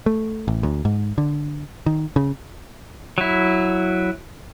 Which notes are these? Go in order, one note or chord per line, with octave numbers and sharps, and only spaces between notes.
A3
A1
D2
G#2
D3
D#3
C#3
F#3 E4